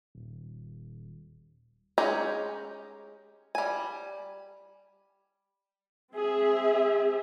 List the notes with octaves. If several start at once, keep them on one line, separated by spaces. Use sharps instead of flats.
D#1
G#3 C#4 D#4 G4 G#4
G3 G#5
C4 G#4 E5